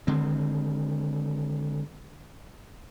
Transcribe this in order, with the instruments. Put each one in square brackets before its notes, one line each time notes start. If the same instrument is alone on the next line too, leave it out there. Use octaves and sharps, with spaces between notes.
[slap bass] D3 D#3 G#3 C4